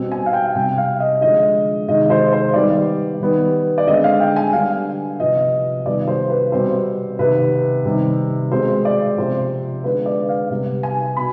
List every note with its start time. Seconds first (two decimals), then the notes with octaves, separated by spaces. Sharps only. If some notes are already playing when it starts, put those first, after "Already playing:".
Already playing: B2 G3 C4
0.12 G#5
0.26 F5
0.33 G5
0.55 C3 G3 C4 G5
0.78 F5
1.00 D#5
1.21 D3 F3 G#3 D#5
1.88 C3 D#3 G#3 D#5
2.10 C5
2.33 C5
2.54 D#3 G3 B3 D5
3.20 D#3 G3 B3
3.78 D5
3.87 D3 G#3 C4 D#5
4.04 F5
4.20 G5
4.36 G#5
4.53 D3 G3 B3 F5
5.20 C3 F3 B3 D#5
5.86 C3 D#3 G3 B3 D5
6.08 C5
6.30 B4
6.52 B2 G3 C4 C5
7.19 C3 D#3 B3 B4
7.85 C3 D#3 G3 C4
8.51 B2 G#3 C4 C5
8.85 D5
9.18 C3 F3 C4 C5
9.84 D3 G#3 B3 B4
10.06 D5
10.29 F5
10.50 C3 G3 B3
10.83 G#5
11.17 B2 B5